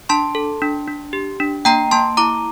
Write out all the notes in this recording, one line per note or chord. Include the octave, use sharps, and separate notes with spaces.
D4 A5 C6
A4
D4
D4
G4
D4
A#3 G5 A#5
A#3 A5 C6
E4 A#5 D6